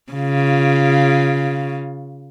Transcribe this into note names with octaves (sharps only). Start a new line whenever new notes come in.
C#3 F4